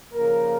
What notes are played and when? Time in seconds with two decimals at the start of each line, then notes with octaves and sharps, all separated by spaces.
0.12 C#3 F3 A#3 A#4